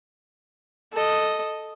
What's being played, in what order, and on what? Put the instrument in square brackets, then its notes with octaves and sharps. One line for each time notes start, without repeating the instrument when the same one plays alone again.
[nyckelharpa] A4 D#5